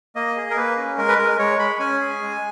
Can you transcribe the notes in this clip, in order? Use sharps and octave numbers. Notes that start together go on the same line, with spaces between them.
A#3 D#5
G#4
A#4
A#3 B4
C#4
G#3 A#4
B4
G#3 A#4
G#3 C#5
G#3 B5
C#4 G#5
G#4
G#3